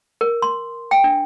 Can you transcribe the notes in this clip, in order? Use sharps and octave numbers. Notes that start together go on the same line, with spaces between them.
A#4
C6
G5
D4